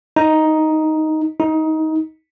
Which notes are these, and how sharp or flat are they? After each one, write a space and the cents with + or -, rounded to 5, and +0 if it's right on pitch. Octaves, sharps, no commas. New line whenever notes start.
D#4 +5
D#4 +20